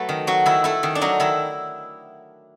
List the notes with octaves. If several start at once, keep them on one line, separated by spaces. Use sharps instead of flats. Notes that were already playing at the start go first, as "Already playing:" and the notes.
Already playing: F#3 A3 B4
D#3
F#3 F#4
D#3 E4
A3 E4
D#3
D4
F#3 D#4
D#3 E4